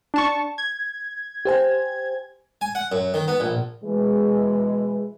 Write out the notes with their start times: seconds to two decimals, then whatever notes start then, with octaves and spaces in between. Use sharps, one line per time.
0.14 D4 A5 C#6
0.58 G#6
1.45 G4 C5 G#5
2.61 G#5
2.75 F#5
2.92 F#2
3.14 D#3
3.28 B3
3.40 A#1
3.83 B2 E3 G#3